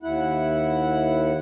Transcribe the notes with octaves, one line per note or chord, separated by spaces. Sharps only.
D#2 E4 F#5